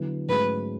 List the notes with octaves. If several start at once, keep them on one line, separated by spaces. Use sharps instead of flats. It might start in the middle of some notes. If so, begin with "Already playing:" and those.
Already playing: D3 F#3 B3 E4
G#2 F#3 A3 C#4 G#4 B4